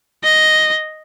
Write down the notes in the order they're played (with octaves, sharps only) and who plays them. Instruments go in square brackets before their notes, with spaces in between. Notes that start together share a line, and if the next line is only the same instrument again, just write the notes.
[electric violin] D#5